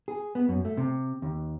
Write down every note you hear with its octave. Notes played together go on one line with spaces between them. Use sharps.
G#4
B3
F#2
A3
C3
D#2